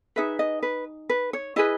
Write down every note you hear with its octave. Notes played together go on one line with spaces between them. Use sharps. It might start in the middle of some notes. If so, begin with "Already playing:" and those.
D#4 G#4 B4 E5
D#5
B4
B4
C#5
E4 G#4 B4 D#5